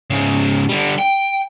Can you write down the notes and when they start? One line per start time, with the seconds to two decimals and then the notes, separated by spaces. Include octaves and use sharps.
0.10 G#2 C#3
0.69 D3 G3
0.98 G5